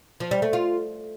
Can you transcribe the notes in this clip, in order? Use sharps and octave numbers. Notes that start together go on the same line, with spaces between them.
F3
G3
A3
F4